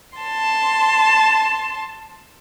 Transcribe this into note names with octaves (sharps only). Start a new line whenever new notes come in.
A5 C6